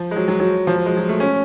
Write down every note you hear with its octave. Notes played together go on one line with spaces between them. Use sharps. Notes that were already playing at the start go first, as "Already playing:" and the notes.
Already playing: F3
G#3
F#3
F#3
F#3
F3
F#3
G#3
F#3
A3
C#4